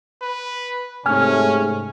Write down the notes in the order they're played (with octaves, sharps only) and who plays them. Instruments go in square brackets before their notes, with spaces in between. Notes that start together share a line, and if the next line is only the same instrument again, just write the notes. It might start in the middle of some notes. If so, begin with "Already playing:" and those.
[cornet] B4
[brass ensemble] G#2 C3 A3 [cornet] C#4 [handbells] G#5 F6